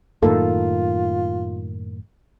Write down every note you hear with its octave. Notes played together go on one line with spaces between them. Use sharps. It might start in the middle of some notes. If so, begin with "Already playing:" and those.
F#2 A2 D#3 A#3 D#4 F4 A4